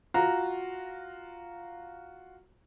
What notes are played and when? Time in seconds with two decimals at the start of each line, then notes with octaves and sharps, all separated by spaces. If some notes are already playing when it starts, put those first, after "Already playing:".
0.14 F4 F#4 A#5